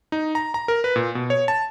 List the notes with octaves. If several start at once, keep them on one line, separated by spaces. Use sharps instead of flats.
D#4
A#5
A#5
A#4
B4
A#2
B2
C#5
A5